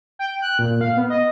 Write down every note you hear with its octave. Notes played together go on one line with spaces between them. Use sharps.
G5
F#6
A#2
F5
B3
D#5